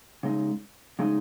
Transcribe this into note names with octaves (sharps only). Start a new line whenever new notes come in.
C#3 G#3 D#4
C#3 G#3 D#4